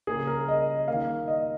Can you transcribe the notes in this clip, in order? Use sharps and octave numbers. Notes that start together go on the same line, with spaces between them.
C#3 A#3 G#4
A#4
D#5
D#3 A#3 F5
D#5